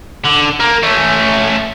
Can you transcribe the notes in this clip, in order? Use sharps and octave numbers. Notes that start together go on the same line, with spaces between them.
D3
A#3
A3 C#4